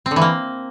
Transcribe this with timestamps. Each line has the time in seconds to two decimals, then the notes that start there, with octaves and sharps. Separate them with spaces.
0.06 C4
0.11 D3
0.16 E3
0.21 A#3